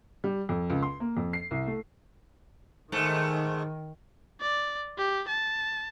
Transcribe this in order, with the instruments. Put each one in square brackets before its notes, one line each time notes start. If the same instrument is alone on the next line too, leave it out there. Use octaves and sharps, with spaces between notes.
[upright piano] G3
F2
C#2
C6
A#3
F2
C7
C2
A3
[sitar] G#2 A3 [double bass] D#3
[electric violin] D5
G4
A5